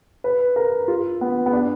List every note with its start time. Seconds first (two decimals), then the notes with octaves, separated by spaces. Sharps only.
0.24 B4
0.56 A#4
0.88 F4
1.21 B3
1.46 B3
1.53 D4